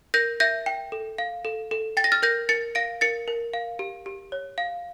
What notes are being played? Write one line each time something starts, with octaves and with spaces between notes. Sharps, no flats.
A#4 G6 A#6
E5 G6 A#6
G5
A4
F5
A4
A4
G5 A6
A#6
F6 A6
A#4 G6 A#6
A#4 A6 C#7
F5 A#6 D7
A#4 A6 C#7
A#4
F5
G4
G4
C#5
F5